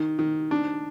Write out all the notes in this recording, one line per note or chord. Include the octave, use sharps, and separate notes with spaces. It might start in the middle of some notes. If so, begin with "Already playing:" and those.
Already playing: D#3
D#3
D4